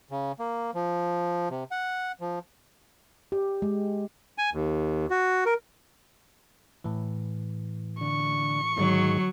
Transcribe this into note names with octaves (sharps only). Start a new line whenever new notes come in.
C#3
A#3
F3
C3
F#5
F3
G4
G#3
G#5
D#2
F#4
A#4
A2 E3
D3 C#6
G#2 D3 D#3 F#3 C#5